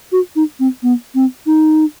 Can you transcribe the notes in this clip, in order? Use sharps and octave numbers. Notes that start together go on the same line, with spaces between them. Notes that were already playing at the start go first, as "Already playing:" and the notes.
F#4
D#4
C4
B3
C4
D#4